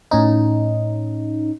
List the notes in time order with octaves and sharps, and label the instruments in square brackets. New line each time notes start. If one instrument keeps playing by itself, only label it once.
[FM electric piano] A2 C#4 D#4